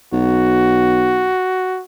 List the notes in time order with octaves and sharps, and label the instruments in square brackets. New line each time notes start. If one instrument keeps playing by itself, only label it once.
[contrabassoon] B1 [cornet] F#4